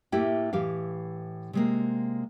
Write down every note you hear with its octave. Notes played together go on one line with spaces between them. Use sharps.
A2 A3 A#3 E4 G4
A2 E3 G4 F5
C3 G#3 A#3